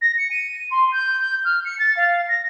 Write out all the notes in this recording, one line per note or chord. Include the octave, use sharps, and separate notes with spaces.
A#6
C#7
D#7
C6
G6
G6
F6
C#7
A6
F5
A#6